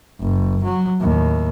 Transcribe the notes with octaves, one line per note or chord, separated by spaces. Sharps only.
F#1
F#3
D#2 A2